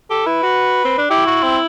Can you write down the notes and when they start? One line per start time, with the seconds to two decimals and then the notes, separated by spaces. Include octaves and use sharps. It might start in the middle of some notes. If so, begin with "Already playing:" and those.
0.10 G4 A4
0.26 E4 B4
0.43 F#4
0.85 C4
0.98 D4
1.10 E4 G4
1.27 F#4
1.43 C4